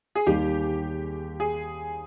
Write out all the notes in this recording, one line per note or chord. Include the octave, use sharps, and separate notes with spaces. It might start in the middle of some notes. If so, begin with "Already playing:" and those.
G#4
D#2 D#3 G3 G4
G#4